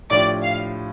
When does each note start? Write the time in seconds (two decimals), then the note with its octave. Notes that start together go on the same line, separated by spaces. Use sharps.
0.11 A2 F3 D4 G4 D5
0.43 F5